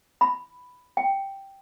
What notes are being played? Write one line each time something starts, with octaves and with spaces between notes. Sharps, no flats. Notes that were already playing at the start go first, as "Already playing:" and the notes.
B5
G5